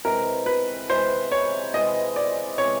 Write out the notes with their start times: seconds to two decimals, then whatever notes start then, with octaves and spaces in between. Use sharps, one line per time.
0.05 C3 E3 G#3 A#4
0.46 B4
0.89 C3 E3 G#3 C5
1.31 C#5
1.73 C3 E3 G#3 D#5
2.16 D5
2.58 C3 E3 G#3 C#5